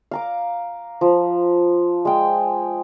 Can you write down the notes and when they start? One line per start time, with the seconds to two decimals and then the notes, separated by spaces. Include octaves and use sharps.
0.11 F5 A#5 D6
1.01 F3
2.05 G#3 G5